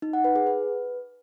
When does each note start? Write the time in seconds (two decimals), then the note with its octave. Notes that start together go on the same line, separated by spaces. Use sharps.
0.02 D#4
0.13 F#5
0.24 B4
0.36 G#4
0.47 B4